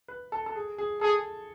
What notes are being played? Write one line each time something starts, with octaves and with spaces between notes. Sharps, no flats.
B4
A4
A4
G#4
G#4
G#4 A4